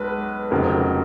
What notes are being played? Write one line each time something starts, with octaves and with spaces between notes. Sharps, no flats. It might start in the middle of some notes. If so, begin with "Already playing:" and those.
Already playing: B1 G#3 B4
F1 F2 C#3 F#3 A#3